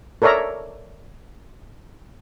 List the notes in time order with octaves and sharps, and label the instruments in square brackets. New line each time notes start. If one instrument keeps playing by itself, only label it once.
[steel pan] A4 A#4 C#5 D5 E5 A#5